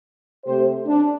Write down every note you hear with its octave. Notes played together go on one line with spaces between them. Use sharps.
C3 A3 C4 G4 C5
D4